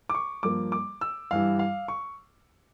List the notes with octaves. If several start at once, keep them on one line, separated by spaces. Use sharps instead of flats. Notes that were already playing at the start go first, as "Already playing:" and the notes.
D6
C#6
G2 F3 A#3 D6
D6
E6
G2 E3 G3 F5
F5
C#6